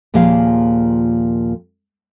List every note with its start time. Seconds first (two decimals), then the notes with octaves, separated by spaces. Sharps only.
0.14 D#2 A#2 F3 A#3 G#4 F5